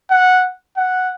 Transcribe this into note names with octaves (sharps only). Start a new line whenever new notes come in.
F#5
F#5